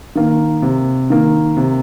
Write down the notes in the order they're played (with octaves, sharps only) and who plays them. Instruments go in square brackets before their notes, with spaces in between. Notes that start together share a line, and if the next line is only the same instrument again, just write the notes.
[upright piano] D#3 A#3
C3
D#3 A#3
C3